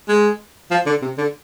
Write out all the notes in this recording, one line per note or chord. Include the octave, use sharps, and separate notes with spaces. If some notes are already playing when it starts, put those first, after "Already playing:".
G#3
F3
D3
C3
D3